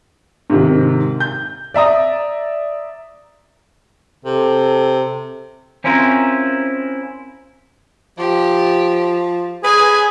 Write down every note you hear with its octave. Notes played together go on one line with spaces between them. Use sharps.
G#2 C3 D#3
G6
D5 E5 A#5 D#6
C3 A4
C4 C#4 E4 F4 A#4 C5
F3 G4
G#4 B4 G#5